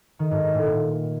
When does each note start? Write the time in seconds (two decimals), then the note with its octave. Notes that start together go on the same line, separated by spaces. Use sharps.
0.19 D#3
0.31 G#2
0.43 G#2
0.54 A2
0.66 A#2